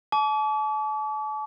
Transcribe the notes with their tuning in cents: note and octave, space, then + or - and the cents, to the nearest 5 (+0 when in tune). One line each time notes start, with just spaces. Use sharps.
A5 -40 D6 -40